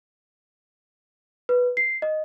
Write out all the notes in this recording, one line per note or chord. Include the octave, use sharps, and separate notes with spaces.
B4
C7
D#5